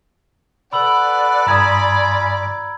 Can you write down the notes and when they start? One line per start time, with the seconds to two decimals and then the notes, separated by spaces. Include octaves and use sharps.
0.73 A4 B4 D5 F#5 B5 E6 F#7
1.47 G2 F4 G#5 A#5 B5 D#6 G#6